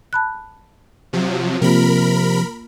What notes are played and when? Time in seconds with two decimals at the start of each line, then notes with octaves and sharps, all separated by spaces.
0.13 A5 B5 F#6
1.13 C3 F3 F#3
1.62 C3 F3 A#3 F4 A#4 B5